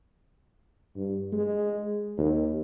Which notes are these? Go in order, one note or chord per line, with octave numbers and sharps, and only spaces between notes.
G2
G#3
D#2